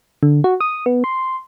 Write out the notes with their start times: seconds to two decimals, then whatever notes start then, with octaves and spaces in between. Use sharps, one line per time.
0.23 D3
0.44 F#4
0.61 D#6
0.86 B3
1.04 C6